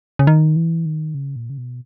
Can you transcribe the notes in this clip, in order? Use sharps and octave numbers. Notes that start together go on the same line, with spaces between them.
C#3
D#3
E3
D#3
C#3
A#2
C#3
B2